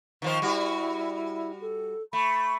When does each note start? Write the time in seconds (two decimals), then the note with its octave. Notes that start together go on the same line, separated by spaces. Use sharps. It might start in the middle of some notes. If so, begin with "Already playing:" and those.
0.22 D#3 F3 C5
0.42 G3 E4 F#4
1.61 A4
2.13 A3 B5